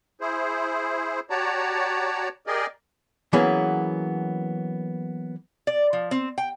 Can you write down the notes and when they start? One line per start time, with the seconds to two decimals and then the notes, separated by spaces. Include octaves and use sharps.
0.21 E4 G#4 C5
1.30 F#4 G4 C#5 D5 A5 A#5
2.47 G4 G#4 A#4 D5 D#5
3.33 E3 F#3 A#3 B3 C#4 G#4
5.67 D5
5.93 F3
6.11 C4
6.38 G5